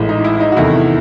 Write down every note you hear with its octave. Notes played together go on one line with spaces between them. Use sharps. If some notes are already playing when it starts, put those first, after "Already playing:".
Already playing: A1 A2 G#3
D#4
E4
D#4
F#4
E2 C3 D#3 A3 E4